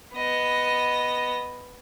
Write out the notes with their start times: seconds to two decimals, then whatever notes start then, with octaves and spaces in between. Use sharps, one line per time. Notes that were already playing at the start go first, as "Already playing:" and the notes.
0.15 B3 D#5